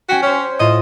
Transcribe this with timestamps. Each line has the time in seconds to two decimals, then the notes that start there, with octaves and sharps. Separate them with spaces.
0.09 C#4 F#4 G5 B6
0.23 C#4 C5 C#5
0.60 A2 F4 D#5 E7